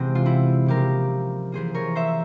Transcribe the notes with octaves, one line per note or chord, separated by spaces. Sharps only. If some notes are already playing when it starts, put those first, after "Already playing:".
Already playing: C3 E3 G#3 C4
F4
C4 E4
C#3 F3 A#3 G4 A#4
E3 A#3 G#4 C5
A#4 C#5
C5 E5